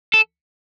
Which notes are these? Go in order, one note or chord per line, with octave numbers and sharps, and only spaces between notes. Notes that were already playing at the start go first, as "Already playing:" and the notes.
A4